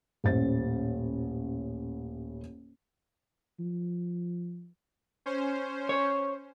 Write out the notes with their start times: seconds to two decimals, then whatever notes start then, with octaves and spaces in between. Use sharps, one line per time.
0.24 D#1 A1 C5 A6
3.60 F3
5.26 C#4 C5
5.89 C#5